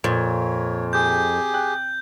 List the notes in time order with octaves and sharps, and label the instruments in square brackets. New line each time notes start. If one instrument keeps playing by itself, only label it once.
[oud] F2 [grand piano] A#2 [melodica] C#5
[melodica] G4 G#4 [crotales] G6
[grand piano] G5 F#6